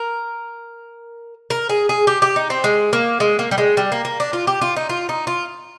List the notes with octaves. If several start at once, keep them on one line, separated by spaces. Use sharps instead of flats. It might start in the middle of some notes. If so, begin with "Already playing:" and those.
Already playing: A#4
A#4
G#4
G#4
G4
G4
D#4
C4
G#3
A#3
G#3
A#3
G3
G#3
G3
A#3
A#3
D4
F4
G4
F4
D#4
F4
D#4
F4